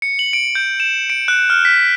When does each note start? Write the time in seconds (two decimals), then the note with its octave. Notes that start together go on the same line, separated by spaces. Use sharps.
0.02 C#7
0.19 F#7
0.33 D7
0.55 G6
0.80 E7
1.10 D7
1.28 F#6
1.50 F6
1.65 B6